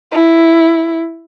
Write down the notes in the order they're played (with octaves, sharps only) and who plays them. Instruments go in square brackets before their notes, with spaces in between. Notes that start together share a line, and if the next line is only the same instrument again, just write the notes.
[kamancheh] E4